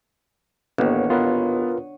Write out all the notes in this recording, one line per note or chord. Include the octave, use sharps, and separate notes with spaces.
A1 D#2 A#3 B3 D4 C#5 F#5
B3 F4 A#4 B4